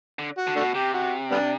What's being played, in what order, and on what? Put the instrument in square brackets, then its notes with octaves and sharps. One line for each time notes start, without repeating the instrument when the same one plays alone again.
[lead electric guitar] D3
[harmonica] F#4
[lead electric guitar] D3
[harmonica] A3 D4 F#4
[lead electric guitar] B2
[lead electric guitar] C3 [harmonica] G4
[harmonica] F#4
G3 B3 D4